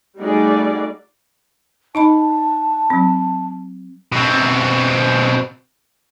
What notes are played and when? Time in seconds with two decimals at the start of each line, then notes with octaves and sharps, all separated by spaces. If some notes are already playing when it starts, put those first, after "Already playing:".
0.19 G3 A3 D#4 F#4 G#4 D5
1.95 D#4 D#5 A5 B5
2.90 F#3 C4
4.12 B2 C4